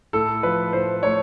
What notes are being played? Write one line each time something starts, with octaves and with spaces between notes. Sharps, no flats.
A2 A4
F3 B4
A2 C5
A3 C#5